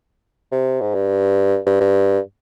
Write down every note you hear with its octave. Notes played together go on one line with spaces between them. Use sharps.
C3
G#2
G2
G2
G2